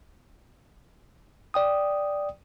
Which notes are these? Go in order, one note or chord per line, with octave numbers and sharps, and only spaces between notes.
D5 G5 D#6